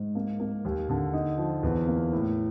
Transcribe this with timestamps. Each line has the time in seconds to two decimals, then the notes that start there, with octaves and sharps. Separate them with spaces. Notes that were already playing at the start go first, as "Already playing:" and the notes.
Already playing: G#2
0.15 A#3
0.40 A#3
0.65 D#2
0.89 D3
1.13 D#4
1.38 F3
1.63 E2
1.87 A#3
2.13 A2